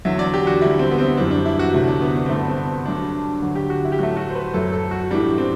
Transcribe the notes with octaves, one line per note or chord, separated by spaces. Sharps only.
E2 D3 F#3 E5
D5
G4
F#4
D2 D3 G3 E4
C4
B3
C4
F#2 E3 G3 D4
D4
E4
F#4
D2 C3 F#3 A3 E4
D4
B3
D4
G2 D3 A3 C4
B3
C4
G2 F#3 A3 D4
D2 D3 F#3
G4
F#4
E4
G4
A2 F#3 A3 F#4
F#4
C5
B4
F#2 F#3 A3 A4
A4
F#4
A2 E3 G3 D4
C4